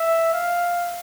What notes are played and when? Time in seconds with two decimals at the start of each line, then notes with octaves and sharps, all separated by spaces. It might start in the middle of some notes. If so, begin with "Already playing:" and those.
Already playing: E5
0.34 F5